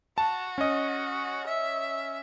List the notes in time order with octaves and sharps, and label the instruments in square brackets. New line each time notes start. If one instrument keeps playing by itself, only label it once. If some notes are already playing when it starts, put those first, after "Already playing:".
[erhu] F#4 [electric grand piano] A5
[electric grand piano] C#4 D#5
[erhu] E5